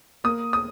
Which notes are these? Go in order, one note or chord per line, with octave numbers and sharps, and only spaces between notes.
A#3 D#6
D#6